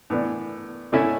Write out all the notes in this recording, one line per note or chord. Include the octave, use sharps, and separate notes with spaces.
A2 E3 B3 D4
D3 A3 C#4 E4